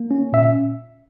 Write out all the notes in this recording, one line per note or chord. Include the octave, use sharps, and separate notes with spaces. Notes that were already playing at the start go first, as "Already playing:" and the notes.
Already playing: A#3
C#4
A#2 E5